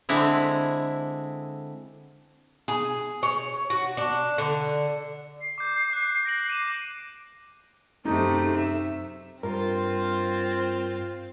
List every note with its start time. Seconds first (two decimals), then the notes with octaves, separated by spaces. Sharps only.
0.09 D3 G#3 C4 E4
2.68 G#4
3.23 C#5
3.70 F#4
3.97 D4
4.38 D3
5.41 C7
5.58 D6 G6
5.90 D6 F#6
6.25 A#6 D7 F#7
6.50 D6 D#7 E7
8.05 F#2 C3 A3 D#4
8.56 E5
9.43 G2 C4 F4 A#4